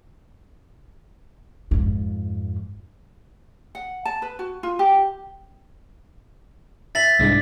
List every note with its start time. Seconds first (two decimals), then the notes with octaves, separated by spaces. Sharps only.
1.71 F2 G#2
3.75 F#5
4.05 A5
4.22 B4
4.39 F#4
4.63 F4
4.79 G4
6.95 E5 A6 B6 F#7
7.19 C2 G#2 D4